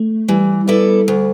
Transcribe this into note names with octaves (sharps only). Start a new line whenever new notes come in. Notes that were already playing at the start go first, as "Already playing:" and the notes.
Already playing: A3
E3 G3
B3 E4 A4 D5
D2